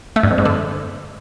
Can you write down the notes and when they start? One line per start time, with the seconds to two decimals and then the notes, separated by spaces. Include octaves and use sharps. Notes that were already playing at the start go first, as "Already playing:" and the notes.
0.16 A3
0.23 G2
0.31 F2
0.38 G#2
0.45 D3